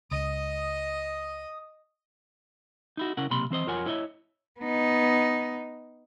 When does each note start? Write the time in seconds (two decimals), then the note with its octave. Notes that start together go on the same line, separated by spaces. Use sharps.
0.11 C#2 D#5 D#6
2.97 D#4 E4 F#4
3.17 C#3 C#4 E4 A#4 F#5
3.31 B1 C3 A#3 B5 C6
3.50 E3 C4 C5 D#5
3.67 F2 F4 A#4 C#5 F#5 G#5
3.86 E4 C#5 D#5 E5
4.60 B3 D#4